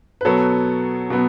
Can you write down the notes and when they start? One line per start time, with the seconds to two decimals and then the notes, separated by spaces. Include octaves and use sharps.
0.21 B4
0.25 B2 F#3 B3 A4 C#5
1.10 B2 F#3 B3